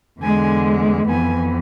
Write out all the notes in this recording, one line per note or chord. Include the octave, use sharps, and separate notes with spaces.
E2 D3 G#3 G#5
F2 E3 B3 G#5